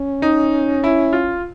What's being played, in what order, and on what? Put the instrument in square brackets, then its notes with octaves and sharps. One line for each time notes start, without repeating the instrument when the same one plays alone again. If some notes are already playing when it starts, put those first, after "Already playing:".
Already playing: [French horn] C#4
[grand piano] D#4
E4
F4